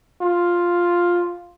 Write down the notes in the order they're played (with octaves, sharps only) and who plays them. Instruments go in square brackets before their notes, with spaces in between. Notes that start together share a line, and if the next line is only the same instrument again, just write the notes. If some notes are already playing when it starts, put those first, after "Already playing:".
[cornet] F4